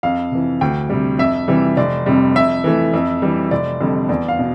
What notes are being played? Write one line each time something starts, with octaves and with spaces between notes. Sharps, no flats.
F2 F5
C3 E3
D2 G5
C3 G3
F2 E5
C3 E3 G3
F1 D5
F2 C3 G3
F2 E5
E3 A3
F2
E3 G3
F1 D5
F2 D3 G3
E2 D5
F5
B2